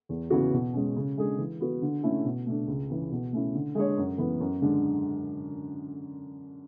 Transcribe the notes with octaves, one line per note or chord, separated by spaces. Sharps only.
E2
C#3 E3 B3 F#4
B2
G#3 C#4
C#3
G#3 D4 G#4
E3
B3 F#4
D3
A3 C#4 E4
B2
A3 D4
C#2
C#3 E3
B2
A3 C#4 E4
D3
G#3 D4 G#4 C#5
F#2
E3 B3
F#2
D3 G#3 D4